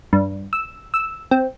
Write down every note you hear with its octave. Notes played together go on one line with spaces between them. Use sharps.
G2
E6
E6
C4